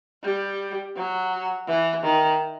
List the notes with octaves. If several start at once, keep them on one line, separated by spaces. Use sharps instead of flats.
G3
F#3
E3
D#3